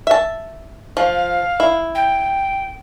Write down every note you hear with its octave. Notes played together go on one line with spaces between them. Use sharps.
E5 A5
F3 F5
E4
G5